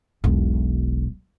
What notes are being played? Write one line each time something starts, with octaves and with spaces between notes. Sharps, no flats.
E1 B1